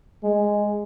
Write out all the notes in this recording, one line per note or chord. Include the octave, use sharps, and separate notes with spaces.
G#3